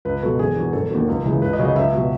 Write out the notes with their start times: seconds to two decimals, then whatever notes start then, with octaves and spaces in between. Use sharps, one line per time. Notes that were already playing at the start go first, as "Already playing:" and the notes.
0.05 C#2 B4
0.22 B2 F#3 A4
0.39 E1 G#4
0.56 E2 B2 F#3
0.73 E1 A4
0.90 D#2 D#3 F#3
1.08 C#2
1.25 C#3 E3 G#3
1.42 C#2 B4
1.53 D#5
1.59 C#3 F#3
1.65 D#5
1.76 C#2 E5
1.93 B2 F#3